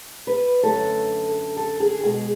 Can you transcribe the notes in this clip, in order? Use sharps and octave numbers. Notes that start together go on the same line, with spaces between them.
B4
F#2 D3 A3 A4
A4
G#4
B2 G#3 G#4